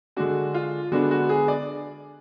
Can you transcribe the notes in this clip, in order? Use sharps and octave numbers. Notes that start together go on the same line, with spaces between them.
D3 G#3 D4 F#4
F4
D3 G#3 B3 D4 F#4
F#4
G#4
D5